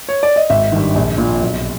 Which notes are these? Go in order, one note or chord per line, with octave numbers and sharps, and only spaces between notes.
C#5
D5
D#5
G#1 E5
G2 D#3
A#1
A#2
B1